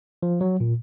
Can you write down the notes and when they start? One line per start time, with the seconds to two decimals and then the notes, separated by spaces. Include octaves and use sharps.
0.23 F3
0.41 F#3
0.60 A#2